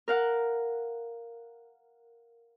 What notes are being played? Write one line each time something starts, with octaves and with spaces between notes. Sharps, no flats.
A#4 F5 F#5